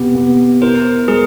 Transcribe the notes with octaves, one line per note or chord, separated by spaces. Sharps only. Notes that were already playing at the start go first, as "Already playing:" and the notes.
Already playing: C3 B3 G4
B3
E4 A#4 C5
G#3 G#4 A#4